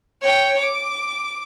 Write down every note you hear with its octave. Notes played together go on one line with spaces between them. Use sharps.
C#5 G5
D6